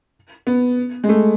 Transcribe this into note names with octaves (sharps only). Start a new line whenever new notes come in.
B3
G#3
A3